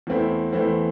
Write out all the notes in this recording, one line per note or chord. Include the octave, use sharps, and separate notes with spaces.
E2 E3 A3 C4 E4
E2 E3 A3 C4 E4